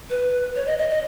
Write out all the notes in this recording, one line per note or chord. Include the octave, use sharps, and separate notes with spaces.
B4
C#5
D#5
D#5
D#5